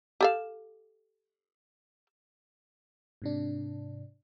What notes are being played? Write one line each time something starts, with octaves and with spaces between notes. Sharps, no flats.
G4 A4 F5
G#2 C3 D4